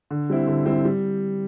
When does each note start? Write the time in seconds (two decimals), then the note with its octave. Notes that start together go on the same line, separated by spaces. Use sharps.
0.10 D3
0.30 G3 C4 E4
0.47 D3
0.66 G3 C4 E4
0.85 G3